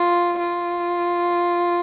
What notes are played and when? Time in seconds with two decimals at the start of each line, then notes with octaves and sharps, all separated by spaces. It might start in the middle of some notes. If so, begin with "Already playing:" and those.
Already playing: F4
0.39 F4